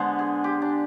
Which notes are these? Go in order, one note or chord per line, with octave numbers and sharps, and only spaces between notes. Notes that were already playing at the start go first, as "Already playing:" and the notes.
Already playing: D3 G#3 B3 C5
G#4
G4
D4